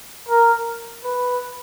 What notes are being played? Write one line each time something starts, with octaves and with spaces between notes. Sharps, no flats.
A#4
B4